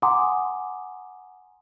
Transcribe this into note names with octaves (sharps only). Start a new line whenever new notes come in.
F#5 G#5 A#5 C6 D6 D#6